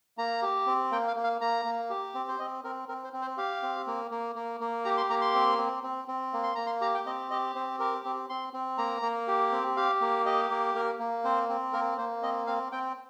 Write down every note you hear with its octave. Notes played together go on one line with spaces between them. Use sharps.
A#3 A#5
G4
C4
A#3 G5
F5
A#3
F5
A#3 A#5
A#3
G4
C4
C5
C4 D#5
C4 A#4
C4 A#4
C5
C4
C5
G4 F5
C4
A#3
A#3
A#3
A#3
G4 A#5
C6
A#3 A#5
C6
C4
C4
C4
C4
A#3
C6
A#3 A#5
C6
G4 A#5
G5
C4 D#5
G4 D#5
C4 C5
G4 A#4
C4
C4 C6
C4
A#3 A#5
A#3
G4
C4
G4 F5
A#3
G4 D#5
A#3
A#3 A#4
A#3
C4 C5
C4
A#3 A#4
A#3 C5
C4 D#5
C4 F5
C4 G5